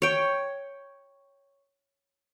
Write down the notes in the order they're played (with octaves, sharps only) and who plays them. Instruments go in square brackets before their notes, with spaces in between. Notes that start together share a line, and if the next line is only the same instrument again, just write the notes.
[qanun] C#5 G5